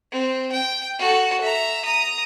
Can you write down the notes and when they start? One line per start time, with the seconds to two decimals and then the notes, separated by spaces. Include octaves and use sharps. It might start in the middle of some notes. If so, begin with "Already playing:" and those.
0.12 C4
0.52 G5
0.99 F#4 A4
1.41 E5 A#5
1.85 A#5 D#6